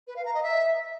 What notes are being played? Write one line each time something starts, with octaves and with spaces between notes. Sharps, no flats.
B4
F5
A#5
D#5
E5